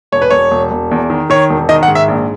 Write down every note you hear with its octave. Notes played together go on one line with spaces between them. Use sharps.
E1 C#5
B4
E1 C#5
E1
E1
E2
D#3
D#3 C#5
E1
D#3 D#5
F#5
G#2
E5
A#1